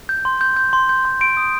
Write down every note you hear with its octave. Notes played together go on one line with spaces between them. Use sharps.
G6
C6
G6
G6
C6
G6
C6
C6 D7
D#6